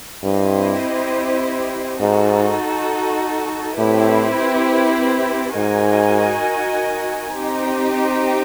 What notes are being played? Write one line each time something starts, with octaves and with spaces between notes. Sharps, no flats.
G2 C4 E4 G4 C5 D#5
G#2 D#4 F#4 A4
A2 C4 E4 G4 B4
G#2 D#4 F#4 A#4 D#5 G#5
C4 D#4 G4